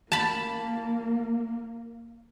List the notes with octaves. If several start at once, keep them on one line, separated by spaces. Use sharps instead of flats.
A#3 A5 B5